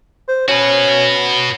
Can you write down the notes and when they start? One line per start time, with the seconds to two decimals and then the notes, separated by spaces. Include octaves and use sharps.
0.29 C5
0.48 C#4 F#4 B4